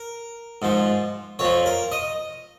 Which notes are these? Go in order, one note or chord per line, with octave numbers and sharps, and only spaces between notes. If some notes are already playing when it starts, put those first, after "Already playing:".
Already playing: A#4
G#2 F3
F2 F3 C#5
A#4
D#5